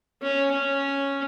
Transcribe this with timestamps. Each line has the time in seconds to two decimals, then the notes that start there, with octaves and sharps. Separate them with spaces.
0.22 C#4
0.51 C#4